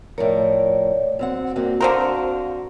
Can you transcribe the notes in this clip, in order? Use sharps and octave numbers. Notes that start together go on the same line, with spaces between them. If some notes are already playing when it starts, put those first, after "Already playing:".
A2 F3 A#4 C#5 D5
F#2 C4 F#5
G2 A#3 C4 F#4
D3 C4 F#4 A#4 F5